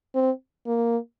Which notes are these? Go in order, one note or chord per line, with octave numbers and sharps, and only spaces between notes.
C4
A#3